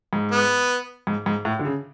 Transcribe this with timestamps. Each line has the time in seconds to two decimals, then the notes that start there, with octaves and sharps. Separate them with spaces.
0.13 G#2
0.31 B3
1.07 G#2
1.26 G#2
1.45 A2
1.59 D3
1.65 C#3